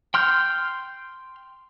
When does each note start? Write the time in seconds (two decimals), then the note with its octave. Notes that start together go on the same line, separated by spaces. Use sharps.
0.14 G5 C6 F6 G6